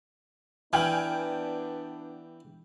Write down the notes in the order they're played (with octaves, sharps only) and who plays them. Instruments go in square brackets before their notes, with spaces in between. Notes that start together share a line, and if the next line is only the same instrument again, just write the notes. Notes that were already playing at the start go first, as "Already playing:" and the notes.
[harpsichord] E3 [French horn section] B3 D4 [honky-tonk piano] G5 G#5 F6